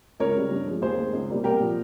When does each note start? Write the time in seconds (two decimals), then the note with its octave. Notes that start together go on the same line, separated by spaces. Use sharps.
0.20 C#2 A#4 C#5
0.35 C#3 G3
0.51 G2
0.66 F3 G#3
0.82 D#2 G#4 C5
0.97 D#3 G#3
1.13 C#2
1.29 C3 G3 A#3
1.44 C2 G4 A#4
1.60 A#2 F3